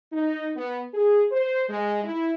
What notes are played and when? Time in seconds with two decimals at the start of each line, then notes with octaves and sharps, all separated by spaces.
0.12 D#4
0.56 B3
0.94 G#4
1.32 C5
1.70 G#3
2.04 E4